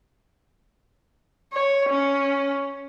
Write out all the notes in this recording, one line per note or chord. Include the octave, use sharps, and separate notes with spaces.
C#5
C#4